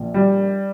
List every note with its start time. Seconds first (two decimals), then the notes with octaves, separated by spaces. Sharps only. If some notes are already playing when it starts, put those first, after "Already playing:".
Already playing: A#1 A#2
0.14 G3